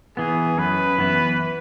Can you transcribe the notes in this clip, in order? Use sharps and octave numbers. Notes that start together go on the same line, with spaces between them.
E3 B3 G#4
F#2 B4
E3 B3 E4